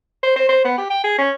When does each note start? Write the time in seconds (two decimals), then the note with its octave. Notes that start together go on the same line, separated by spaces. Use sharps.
0.23 C5
0.36 C5
0.49 C5
0.64 B3
0.78 G4
0.90 G5
1.04 G#4
1.18 C#4